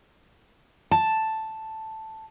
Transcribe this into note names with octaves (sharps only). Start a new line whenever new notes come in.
A5